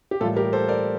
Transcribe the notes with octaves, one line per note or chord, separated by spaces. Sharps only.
G4
A2 E3 G3 A#3 F4 A4
G4 A#4
A4 C5
A#4 D5